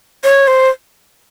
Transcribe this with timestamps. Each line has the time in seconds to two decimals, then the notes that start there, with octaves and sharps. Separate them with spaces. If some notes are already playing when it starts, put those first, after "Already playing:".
0.24 C#5
0.47 C5